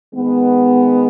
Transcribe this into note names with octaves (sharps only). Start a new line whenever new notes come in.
D#3 G#3 B3